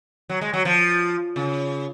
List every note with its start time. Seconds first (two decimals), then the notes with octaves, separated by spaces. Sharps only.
0.29 F#3
0.41 G#3
0.53 F#3
0.65 F3
1.36 C#3